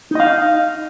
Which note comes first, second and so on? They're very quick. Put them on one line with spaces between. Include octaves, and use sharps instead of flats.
D#4 D#5 F5